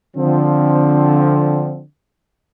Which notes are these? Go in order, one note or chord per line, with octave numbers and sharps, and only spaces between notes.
D3 F3 C4